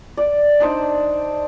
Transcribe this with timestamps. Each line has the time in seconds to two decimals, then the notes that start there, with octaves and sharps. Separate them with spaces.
0.17 D5
0.60 D4 D#4 C5 D5